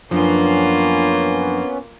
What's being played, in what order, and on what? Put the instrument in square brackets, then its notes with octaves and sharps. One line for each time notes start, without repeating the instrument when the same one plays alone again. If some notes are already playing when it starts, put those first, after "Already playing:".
[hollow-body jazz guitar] F#2 F3 [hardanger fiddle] A#3 F4 [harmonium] B3 C#4 [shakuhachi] D4